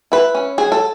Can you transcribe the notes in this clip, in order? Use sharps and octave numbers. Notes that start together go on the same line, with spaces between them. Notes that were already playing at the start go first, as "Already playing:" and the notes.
E4 B4
C#4
F#3 G#4
A4